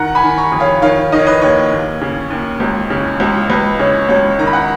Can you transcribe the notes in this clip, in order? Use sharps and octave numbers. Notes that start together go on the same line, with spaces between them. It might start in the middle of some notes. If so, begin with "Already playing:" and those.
Already playing: D#3 F#5 A#5
G#5 B5
D#3
A#5 C#6
F2
C#5 F5
D#3 C#5 F5
D#3 D#5
C#5
B4 D#5
D#2 C#5
D#2
C#3
D#2
C#2
C#3
C#2
C#2 B4
C#3 C#5
C#2 C#5
D#3 A#5
B5
F#5 A#5